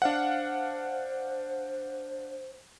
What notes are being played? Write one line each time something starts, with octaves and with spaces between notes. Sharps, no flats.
D4 C5 F5 F#5